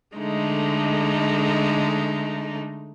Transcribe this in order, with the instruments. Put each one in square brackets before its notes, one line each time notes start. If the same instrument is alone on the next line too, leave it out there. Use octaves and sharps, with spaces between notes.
[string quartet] D3 G#3 A3 D#4